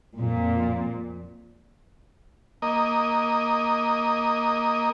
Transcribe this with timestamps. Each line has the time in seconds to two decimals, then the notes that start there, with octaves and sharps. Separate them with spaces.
0.18 F2 A#2
2.62 A#3 D#5